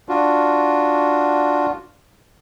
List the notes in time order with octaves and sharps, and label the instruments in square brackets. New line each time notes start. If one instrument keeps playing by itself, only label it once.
[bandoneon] D4 F4 F#4